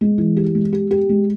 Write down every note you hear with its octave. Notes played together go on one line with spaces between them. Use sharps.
G#3
E3
G4
G#3
G4
G4
G#3